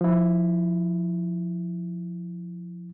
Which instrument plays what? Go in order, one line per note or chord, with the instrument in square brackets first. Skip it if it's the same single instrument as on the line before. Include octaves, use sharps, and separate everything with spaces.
[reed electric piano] F3 E4